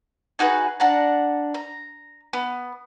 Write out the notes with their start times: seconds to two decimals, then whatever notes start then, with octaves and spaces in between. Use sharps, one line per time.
0.39 D#4 F#4 G#4 B4
0.80 D4 F#5 A5 A#5
1.54 A#5
2.33 B3